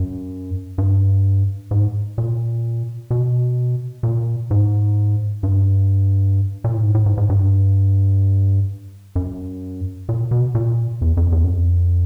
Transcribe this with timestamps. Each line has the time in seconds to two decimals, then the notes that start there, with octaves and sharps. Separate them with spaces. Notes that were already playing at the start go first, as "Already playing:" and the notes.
Already playing: F#2
0.78 G2
1.71 G#2
2.18 A#2
3.10 B2
4.03 A#2
4.51 G#2
5.43 G2
6.64 A#2
6.74 A2
6.83 G#2
6.95 A2
7.06 G#2
7.17 G#2
7.29 G2
9.16 F#2
10.09 A#2
10.31 B2
10.55 A#2
11.01 E2
11.17 F2
11.32 E2
11.44 F#2
11.48 F2